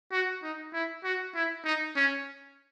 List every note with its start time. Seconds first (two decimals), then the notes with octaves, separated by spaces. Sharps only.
0.12 F#4
0.43 D#4
0.73 E4
1.04 F#4
1.35 E4
1.65 D#4
1.96 C#4